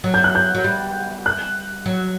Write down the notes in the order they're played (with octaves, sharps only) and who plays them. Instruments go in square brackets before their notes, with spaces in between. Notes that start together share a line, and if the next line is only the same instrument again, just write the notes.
[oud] F#3
[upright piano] G6
F#6
G6
[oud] F#3
G3
[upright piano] F#6
[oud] F#3